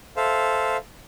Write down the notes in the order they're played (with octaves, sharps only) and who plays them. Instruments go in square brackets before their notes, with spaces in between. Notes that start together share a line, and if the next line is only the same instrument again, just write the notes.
[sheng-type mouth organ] A4 C5 E5 F5